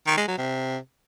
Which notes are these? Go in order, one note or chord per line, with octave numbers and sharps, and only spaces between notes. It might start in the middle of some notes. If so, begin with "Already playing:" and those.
D#3
G#3
F#3
C3